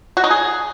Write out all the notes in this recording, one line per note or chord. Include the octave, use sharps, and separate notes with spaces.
F#4
D#4
G#4